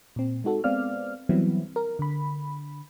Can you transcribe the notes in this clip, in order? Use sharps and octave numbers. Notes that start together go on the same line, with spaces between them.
A#2 C4
G#3 D#4 F#4 A4
G#3 B3 C4 D5 F5 F6
E3 F#3 G3 B3 C4 E4
A#4
D3 B5